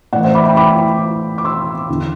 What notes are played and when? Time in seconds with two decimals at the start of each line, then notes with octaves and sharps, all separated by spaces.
0.13 A2 D5 F#5
0.16 E3
0.24 C5 E5
0.35 B5 D6
0.45 G5 B5
0.57 B5 D6
1.38 D6
1.45 C6 E6
1.89 E2 D3